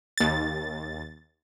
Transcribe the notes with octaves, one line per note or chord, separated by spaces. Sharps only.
D#2 A6